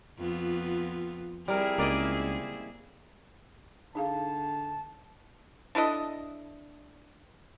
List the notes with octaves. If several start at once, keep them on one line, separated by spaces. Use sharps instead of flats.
F2 B3 F4
G3 C4 E4 G#4 A#4
C#2 A#3 D5 D#5
D3 D#4 G#4 F5 A5
D4 E4 A4 D#5